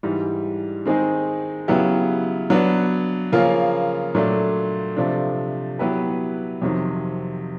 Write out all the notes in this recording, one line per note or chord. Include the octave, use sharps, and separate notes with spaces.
G#2 E3 G3
D#3 G#3 C4 D#4 G#4
C#3 F#3 B3 E4 G4
F#3 B3 D4
C#3 F3 A#3 C#4 F4
A#2 F#3 A3 D4
C3 F3 A3 D4
F#3 B3 E4 G4 B4
F2 C3 D#3 F#3